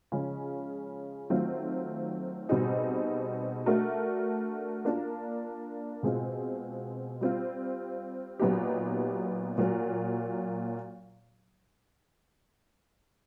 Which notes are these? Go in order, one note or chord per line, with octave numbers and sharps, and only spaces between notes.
C#3 F3 G#3 C#4
D#3 F#3 A3 C4 F4
B2 G3 C4 D#4 G#4
A3 D4 F#4 A#4
A#3 D4 F4
B2 G#3 C4 F4
G3 C4 F4
A#2 F#3 B3 D#4 G4
A#2 F#3 A#3